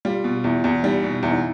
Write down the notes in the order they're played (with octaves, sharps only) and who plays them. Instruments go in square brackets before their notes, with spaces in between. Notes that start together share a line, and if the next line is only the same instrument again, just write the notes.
[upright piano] G3 [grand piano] F4
[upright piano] B2
[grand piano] F4
[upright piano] E2 [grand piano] E4
[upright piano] E2
[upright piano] G3 [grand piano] D#4
[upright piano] B2
[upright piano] E2 [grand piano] E4
[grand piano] D#4